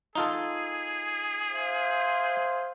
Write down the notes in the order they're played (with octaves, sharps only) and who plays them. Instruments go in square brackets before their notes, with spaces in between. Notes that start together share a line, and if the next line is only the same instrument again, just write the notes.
[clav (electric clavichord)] D#4 F4 A4 [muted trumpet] G#4
[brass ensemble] C5 E5 F5